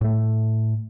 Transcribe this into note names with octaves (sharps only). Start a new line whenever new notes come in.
A2 A3